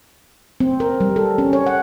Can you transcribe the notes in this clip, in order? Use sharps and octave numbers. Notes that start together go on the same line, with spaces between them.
C4
A#4
G3
A4
C#4
C#5
F#5